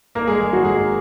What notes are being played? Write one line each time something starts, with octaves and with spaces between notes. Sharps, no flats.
G#1 A#3 A#4
G#3 G#4
G#2 D#3 G#3 G#4
F#3 F#4
G#1 G#3 G#4